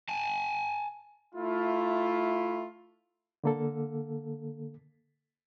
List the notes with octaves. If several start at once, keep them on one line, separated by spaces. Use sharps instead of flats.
G#5 A5
A3 E4 F4
D3 A#3 A4